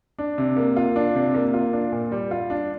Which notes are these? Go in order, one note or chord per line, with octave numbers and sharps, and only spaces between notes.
D4
C3
A#3
F4
D4
C3
A#3
F4
D4
A#2
G3
F4
D4